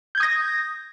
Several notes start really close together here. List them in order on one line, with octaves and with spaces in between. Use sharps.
G6 G#6 D#6 A#6